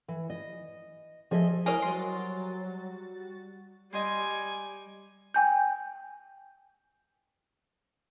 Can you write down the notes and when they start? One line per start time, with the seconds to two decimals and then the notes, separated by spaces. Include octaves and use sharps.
0.08 E3
0.30 D#5
1.31 F3 G#4 D#5 E5
1.66 E4 A#4 C5 D#5 F5 G#5
1.82 F#3 G3 F#4 C6 A6
3.93 G3 D#5 G5 G#5 C6
5.34 G5 G#5 G6